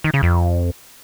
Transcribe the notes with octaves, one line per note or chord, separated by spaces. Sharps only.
D#3
C#3
F2